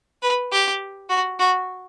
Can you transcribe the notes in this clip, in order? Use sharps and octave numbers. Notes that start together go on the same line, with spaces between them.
B4
G4
F#4
F#4